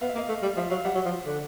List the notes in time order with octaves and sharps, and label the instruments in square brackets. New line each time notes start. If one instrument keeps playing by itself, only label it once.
[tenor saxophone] B3 [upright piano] F5
[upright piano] E5
[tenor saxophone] A#3 [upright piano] D#5 F5
[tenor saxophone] A3
G3
[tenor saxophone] F3 [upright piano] E5
[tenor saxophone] F#3 [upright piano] F5
[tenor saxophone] G3 [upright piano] E5 F#5
[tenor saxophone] F#3
F3
D3